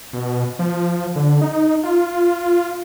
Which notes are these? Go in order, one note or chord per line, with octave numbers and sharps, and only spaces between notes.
B2
F3
D3
D#4
F4